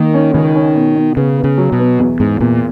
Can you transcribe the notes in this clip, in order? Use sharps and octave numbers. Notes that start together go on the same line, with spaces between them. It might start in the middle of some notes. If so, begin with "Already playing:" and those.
Already playing: D#3 A#3
C#4
C#2 D#3
C#4
B2
B2
C#3 B3
B3
C#3
F#3
B2
B3
E2
E2 G#2
E2 A#2